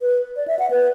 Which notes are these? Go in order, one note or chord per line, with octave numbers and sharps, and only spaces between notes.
B4
D5
E5
F#5
B4